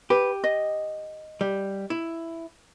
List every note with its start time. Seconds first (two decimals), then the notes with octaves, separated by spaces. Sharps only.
0.10 G4 B4
0.44 D#5
1.41 G3
1.90 E4